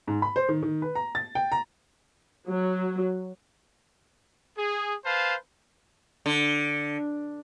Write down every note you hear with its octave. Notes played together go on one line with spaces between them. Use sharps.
G#2
B5
C5
D#3
D#3
B4
A#5
A6
G5
A#5
F#3
G#4
B4 C5 F5 A5
D3